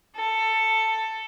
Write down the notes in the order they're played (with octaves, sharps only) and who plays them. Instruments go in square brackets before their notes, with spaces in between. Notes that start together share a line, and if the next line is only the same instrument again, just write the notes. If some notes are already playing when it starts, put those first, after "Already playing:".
[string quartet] A4